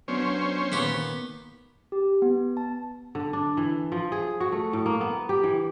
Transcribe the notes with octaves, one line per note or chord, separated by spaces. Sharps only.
F#3 B3 C#4 D4 C5
A#2 D#3 B3 G4
G4
B3
A5
D3
D4
E3
F3
G#4
F#4
A3
A2
A#3
B3
G4
E3